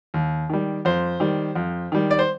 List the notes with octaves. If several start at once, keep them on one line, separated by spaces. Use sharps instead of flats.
D#2
D#3 G3
F2 C5
D#3 G3
F2
D#3 G3
D5
C5